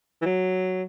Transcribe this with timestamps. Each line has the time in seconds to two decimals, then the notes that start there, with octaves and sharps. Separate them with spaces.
0.22 E3
0.26 F#3